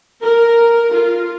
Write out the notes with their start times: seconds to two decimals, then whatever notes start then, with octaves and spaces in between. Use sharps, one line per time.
0.23 A#4
0.95 F4